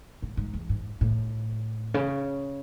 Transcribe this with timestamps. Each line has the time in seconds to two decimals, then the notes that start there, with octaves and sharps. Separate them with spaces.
0.22 G#2
0.37 G#2
0.54 E2
0.69 G#2
1.01 A2
1.94 C#3